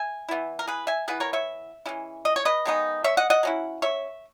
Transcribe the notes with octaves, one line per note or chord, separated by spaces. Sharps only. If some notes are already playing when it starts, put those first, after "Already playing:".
Already playing: E5 G#5
E3 B3 E4
A#4
G#4 B4
E5 G#5
E3 B3 E4 G#4 B4
A#4 C#5
C#5 E5
E3 G#3 C#4 E4
D#5
C#5
B4 D#5
D#3 G#3 B3 D#4
C#5 E5
D#5 F#5
D#5 F#5
F#3 C#4 E4
C#5 E5